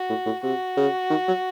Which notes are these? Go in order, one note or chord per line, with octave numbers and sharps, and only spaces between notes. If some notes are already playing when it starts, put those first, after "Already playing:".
Already playing: F#4
A2
A2
C3 F#4
C#3
D#3
F#3